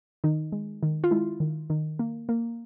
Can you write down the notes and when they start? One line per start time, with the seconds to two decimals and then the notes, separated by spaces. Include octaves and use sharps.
0.24 D#3 D#4
0.52 G#3
0.83 D#3
1.04 F4
1.11 G#3 E4
1.40 D#3
1.70 D#3
1.99 A#3
2.29 A#3